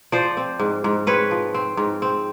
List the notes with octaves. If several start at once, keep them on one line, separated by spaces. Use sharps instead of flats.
F3 C5 D5
C4
G#2
G#2
C4 B4 C#5
F3
C4
G#2
C4